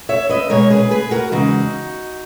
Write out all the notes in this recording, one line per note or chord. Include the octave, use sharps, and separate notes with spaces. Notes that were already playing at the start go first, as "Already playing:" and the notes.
C#5 E5
B4 D#5
B2 G#3 A#4 C#5
G#4 B4
G#4 B4
F#4 A#4
E2 C#3 E3 G#3 D#4 F#4